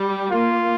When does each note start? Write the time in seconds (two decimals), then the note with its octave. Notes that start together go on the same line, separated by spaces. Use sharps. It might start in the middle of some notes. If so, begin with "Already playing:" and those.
Already playing: G3
0.32 A#3 F4